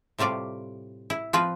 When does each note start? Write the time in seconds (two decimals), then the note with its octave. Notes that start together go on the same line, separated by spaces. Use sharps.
0.19 A2 C3 G3 F4 D5
1.10 E4
1.33 F3 C4 F4 B4